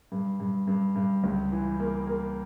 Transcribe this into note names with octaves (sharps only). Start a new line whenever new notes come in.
G2
G2
G2
G2
C#2
E3
A#3
A#3